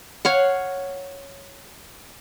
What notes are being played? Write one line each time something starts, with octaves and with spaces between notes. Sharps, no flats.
C#5 F5 F#5